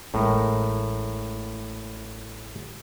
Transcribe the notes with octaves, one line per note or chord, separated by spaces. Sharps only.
A1 A2 G#3 A#4